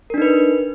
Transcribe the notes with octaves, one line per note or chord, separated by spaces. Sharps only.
D4 D#4 A#4 B4